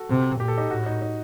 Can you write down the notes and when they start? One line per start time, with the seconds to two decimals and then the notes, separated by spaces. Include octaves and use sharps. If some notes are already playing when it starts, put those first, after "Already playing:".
Already playing: F#4 A4
0.10 C3
0.40 A#2 G4
0.48 A4
0.57 D#4 G4
0.71 A2 F#4
0.86 D#4
1.02 D#4